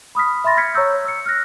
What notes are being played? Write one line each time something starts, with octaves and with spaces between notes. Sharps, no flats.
B5 D#6 F6 B6
E5 B5 C6 A6 A#6
F6 G#6 B6 C#7
C#5 A#5 C#6 E6 G6
E6 C#7
F6 F#6 A#6